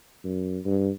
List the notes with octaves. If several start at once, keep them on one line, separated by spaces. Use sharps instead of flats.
F#2
G2